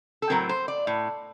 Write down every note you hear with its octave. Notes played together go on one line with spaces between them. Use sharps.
A4
A2 F#3 C4 A#4
C5
D5
A2